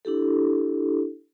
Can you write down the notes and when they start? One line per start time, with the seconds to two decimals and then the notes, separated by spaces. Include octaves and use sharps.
0.05 D4 E4 G4 A4